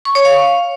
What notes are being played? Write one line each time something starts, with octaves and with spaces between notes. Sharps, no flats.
C#6
C#5
F5